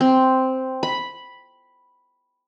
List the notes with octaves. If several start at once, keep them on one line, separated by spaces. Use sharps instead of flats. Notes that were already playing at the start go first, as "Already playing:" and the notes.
C4
B5